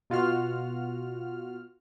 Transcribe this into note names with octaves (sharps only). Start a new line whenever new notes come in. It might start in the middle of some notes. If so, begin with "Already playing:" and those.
B2 F4 F#4 F6